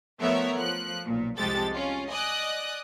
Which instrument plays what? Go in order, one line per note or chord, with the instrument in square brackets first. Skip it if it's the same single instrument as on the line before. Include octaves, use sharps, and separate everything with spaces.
[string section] F3 A3 B3 A#4 C#5 E5
F3 F#6
B1 A#2
C2 F2 G#3 G4 A4 A6
C#4 F4
D5 D#5 G#5 D#6 F#6